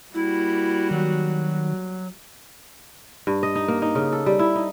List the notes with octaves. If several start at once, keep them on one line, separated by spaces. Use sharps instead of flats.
G3 A#3 E4 F#4
D#3 F#3
G2
D#5
D#4
A#3
D#4
C#3
A4
G3
E4
D#4